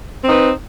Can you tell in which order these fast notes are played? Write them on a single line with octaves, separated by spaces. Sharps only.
C4 D#4 B4